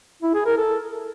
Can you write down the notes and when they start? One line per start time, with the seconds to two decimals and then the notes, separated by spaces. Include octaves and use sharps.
0.22 E4
0.34 G#4
0.46 A#4
0.57 A4